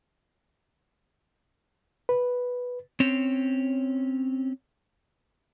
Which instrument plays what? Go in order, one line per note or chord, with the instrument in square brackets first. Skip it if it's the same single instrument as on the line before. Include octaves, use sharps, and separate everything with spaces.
[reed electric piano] B4
[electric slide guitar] C4 C#4 C#5